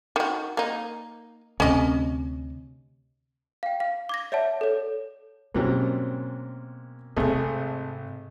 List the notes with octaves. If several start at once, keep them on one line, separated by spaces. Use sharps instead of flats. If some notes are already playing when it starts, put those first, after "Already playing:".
D#3 F#4
A#3 D#4
D2 C3 C#4 D#5
F5 G5
F5
D6 G#6 A#6
C#5 D5 E5 F#5 A5
A4 C#5
G#2 B2 F#3 G3 A#3 C4 C#4
G#1 G#2 C3 A3 G#4